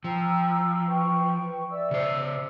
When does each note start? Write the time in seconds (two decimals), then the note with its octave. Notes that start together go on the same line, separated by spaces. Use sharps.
0.04 F3 G5 A#5 E6
0.87 B4 G5 C#6
1.70 D5 E5 E6
1.91 C#3 C5